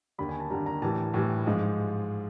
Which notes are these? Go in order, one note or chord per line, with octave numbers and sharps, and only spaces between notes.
D#2 D3 G3 B5
G#5
A5
D#2 D3 G3 A#5
A#5
A2 E3 G3 A5
A2 E3 G3
G#2 F3 G#3